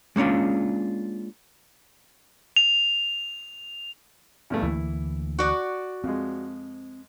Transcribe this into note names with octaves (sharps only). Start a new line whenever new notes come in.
G#3 A#3 C#4 D4 F4
F7
E2 G2 A3
D2 E3 A#3 E4
F#4 D5
F2 G#3 C4